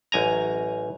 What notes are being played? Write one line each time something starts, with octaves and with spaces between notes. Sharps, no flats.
A1 F#2 G#5 A#5